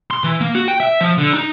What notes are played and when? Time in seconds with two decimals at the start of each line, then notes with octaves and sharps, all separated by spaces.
0.11 C6
0.24 E3
0.41 A#3
0.55 F#4
0.68 G5
0.80 E5
1.01 F3
1.18 D3
1.34 D#4